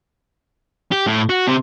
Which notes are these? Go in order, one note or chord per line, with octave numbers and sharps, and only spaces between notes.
G4
A2
F#4
C3